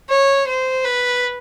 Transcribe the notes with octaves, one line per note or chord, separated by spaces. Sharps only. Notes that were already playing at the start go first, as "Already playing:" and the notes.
C#5
C5
B4